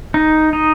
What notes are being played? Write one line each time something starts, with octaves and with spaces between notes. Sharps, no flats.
D#4
D#4